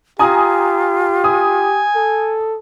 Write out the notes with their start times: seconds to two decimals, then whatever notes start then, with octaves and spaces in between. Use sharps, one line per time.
0.19 F4 G4 G#5 A#5 D#6
1.24 G#5 D#6
1.95 A4